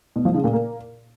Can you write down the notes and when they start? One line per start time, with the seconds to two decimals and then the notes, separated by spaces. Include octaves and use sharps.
0.16 B2
0.25 F3
0.34 C#3
0.44 A#2
0.53 A#3